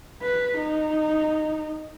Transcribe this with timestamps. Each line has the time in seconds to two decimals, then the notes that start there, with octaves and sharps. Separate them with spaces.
0.22 B4
0.58 D#4